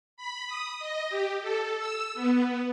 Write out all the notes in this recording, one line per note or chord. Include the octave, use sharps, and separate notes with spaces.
B5
D#6
D#5
G4
A4
E6
B3